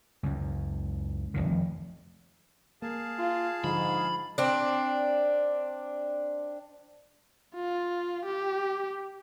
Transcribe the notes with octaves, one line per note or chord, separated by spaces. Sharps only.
C#2 F#2
F1 A#1 F2 D#3
A#3 G#4 F5 A5
F4
G#2 D3 F3 G#3 B5
C4 D4
F4
G4